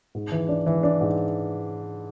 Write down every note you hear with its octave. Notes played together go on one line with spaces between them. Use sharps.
G#2
E3
D4
E3
D4
G#2